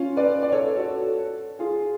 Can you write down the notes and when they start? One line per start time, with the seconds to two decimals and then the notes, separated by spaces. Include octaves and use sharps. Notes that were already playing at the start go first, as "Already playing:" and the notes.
Already playing: C#4 F4
0.17 B4 D5
0.43 D5
0.52 A4 C#5
0.76 F#4 A4
1.59 F4 G#4